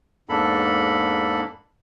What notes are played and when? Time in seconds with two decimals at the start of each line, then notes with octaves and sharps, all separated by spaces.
0.29 E2 G#2 A#3 D4 A4 B5